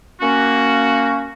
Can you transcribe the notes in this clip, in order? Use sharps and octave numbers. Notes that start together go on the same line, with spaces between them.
A#3 C#4 F#4